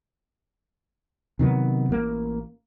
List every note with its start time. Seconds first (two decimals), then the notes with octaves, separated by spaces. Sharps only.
1.39 C3 D#3 F#3 B3
1.89 A1 A#3